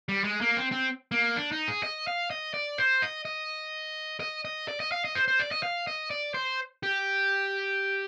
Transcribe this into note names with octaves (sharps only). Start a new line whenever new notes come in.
G3
G#3
A#3
C4
C4
A#3
D4
D#4
G#4
D#5
F5
D#5
D5
C5
D#5
D#5
D#5
D#5
D5
D#5
F5
D#5
C5
C5
D5
D#5
F5
D#5
D5
C5
G4